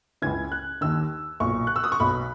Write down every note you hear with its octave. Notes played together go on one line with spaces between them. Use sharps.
C#2 C#3 E3 G#6
F#6
D#2 D#3 E6
B1 A#2 C#6
F#6
E6
D#6
C#6
B1 B2 B5